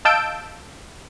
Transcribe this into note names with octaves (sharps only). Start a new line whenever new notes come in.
D#5 F5 A5 E6 G6 D7